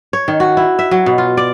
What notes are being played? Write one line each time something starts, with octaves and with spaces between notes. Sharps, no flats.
C#5
D#3
F#4
E4
E5
F#3
B2
F4
D5